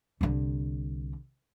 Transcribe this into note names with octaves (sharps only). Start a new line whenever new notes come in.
C2 D3